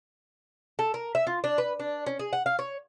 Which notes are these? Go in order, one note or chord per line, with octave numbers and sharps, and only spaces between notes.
A4
A#4
E5
F4
D4
B4
D4
C#4
G#4
F#5
F5
C#5